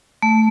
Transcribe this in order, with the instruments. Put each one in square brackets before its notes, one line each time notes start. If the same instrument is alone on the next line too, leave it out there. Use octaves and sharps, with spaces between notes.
[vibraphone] A3